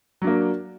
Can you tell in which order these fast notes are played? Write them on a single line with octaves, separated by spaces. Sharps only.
F#3 D4 A#3